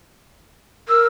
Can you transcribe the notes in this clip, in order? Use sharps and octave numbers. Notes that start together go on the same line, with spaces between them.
A#4 E6